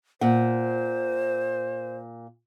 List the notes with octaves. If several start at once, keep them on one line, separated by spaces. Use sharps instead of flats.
A#2 C5 F#5